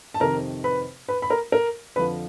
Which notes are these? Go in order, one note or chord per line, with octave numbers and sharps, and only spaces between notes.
A5
F2 C3 D#3 A#4 A#5
B4 B5
B4 B5
B5
A#4 A#5
A#4 A#5
F2 D3 F3 B4 B5